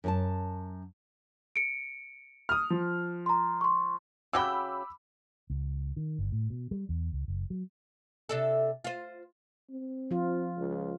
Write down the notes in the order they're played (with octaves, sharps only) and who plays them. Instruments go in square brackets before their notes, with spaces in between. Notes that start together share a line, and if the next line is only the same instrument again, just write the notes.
[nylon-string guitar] F#2 A4 A5
[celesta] C#7 D7
[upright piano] D#6 F6
F3
[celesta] A#5 C6
C6 C#6
[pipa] C#3 F#4 G5 [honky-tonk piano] B5 D6 E6
[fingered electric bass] C#2
D#3
G1
A2
B2
G3
E2
C#2
F#1
F#3
[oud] C3 D4 A4
F4 C5
[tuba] C4
[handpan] F3 F4
[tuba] C#2